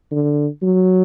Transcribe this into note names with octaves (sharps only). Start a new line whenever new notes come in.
D3
F#3